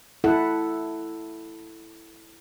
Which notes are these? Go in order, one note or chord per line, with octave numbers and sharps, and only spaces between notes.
E4 A4 F#5